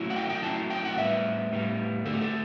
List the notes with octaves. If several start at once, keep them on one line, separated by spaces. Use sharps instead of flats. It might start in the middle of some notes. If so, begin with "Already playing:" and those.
Already playing: F#3 A3 C#4 E4
F#5
G5
G5
F#3 A3 C#4 E4 A5
G5
F#5
A2 G3 B3 E5
A2 G3 B3
D3 A3 D4 A4
G4
A4